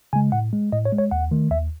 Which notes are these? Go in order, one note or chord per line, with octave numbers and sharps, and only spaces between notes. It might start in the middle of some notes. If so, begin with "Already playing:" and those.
C#3 G#3 G#5
A2 F#5
G#3
A2 D#5
C#5
G#3
C#5
D#2 F#5
D#3 A3
D#2 E5